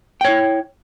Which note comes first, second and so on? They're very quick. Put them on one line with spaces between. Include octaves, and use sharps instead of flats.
G5 C#5 E4